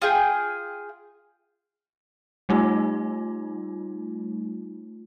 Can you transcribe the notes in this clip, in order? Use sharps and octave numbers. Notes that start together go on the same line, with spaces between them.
F4 G#4 G5
G3 A3 D#4 F4